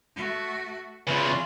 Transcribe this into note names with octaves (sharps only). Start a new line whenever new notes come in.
A3 F#4
E2 C#3 F4 B4